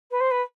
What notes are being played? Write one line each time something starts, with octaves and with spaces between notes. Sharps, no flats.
B4
C5
B4